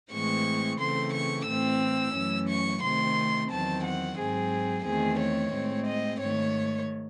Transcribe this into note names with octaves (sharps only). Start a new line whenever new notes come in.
A2 E3 G#3 C4 C#6
C#3 E3 A3 C4 C6
C#6
A2 E3 C4 E6
F#2 E3 A3 C#4
C#6
C3 D#3 A3 C4 C6
E2 D#3 F#3 C4 A5
F#5
G#2 F#3 C4 G#4
E2 D#3 A3 C4 G#4
C#5
A2 G#3 C4
D#5
G#2 D#3 A3 C#5